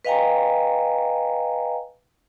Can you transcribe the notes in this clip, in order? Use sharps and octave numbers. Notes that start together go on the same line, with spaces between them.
B4 D#5 F5 G5 G#5 A#5